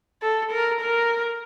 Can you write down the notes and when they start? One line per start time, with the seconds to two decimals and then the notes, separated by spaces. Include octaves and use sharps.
0.22 A4
0.51 A#4
0.81 A#4